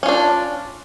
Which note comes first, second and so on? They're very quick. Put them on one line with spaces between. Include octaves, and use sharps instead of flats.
C#4 F4 D4